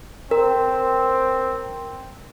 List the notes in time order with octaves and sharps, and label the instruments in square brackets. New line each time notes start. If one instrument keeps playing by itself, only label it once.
[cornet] C4 [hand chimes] A#4